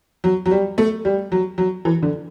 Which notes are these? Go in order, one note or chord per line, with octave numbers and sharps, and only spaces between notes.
F#3
F#3
G3
A3
G3
F#3
F#3
E3
D3